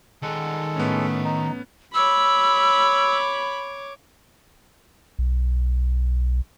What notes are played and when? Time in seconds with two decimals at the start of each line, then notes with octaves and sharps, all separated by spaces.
0.22 D#3 G#3 A4 F#5
0.76 A2 A3 B3 C#4
1.24 D#4
1.94 C#5 B5 D6 E6
5.19 B1